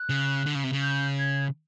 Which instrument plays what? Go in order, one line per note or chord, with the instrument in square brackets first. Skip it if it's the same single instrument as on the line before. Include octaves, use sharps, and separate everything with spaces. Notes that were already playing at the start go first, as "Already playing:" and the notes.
Already playing: [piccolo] F#6
[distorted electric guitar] C#3
D3
C#3
C3
C#3
[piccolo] G6
G#6